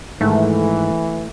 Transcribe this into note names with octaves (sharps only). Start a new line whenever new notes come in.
G#2 D#3 E3 A3